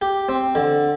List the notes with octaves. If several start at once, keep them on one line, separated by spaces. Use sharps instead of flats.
G4
C4
D3